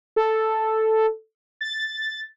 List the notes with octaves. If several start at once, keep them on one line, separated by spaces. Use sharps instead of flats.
A4
A6